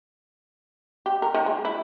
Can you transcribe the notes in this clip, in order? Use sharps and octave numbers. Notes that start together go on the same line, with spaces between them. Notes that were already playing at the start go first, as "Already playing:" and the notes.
G4
A#4
D#3
G#3
E4